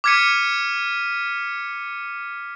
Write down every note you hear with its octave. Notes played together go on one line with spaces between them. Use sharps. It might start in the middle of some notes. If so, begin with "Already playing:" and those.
D6 F6 G#6 B6 C#7 D#7